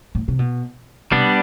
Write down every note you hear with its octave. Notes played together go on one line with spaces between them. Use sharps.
A2
C3
B2
C3 G3 B3 D4